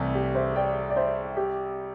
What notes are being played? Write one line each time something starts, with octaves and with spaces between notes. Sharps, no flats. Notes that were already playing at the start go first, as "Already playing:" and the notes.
Already playing: C2 C3 E3 A3
G4
C5 E5
D5 G5
D5
C5 E5
G4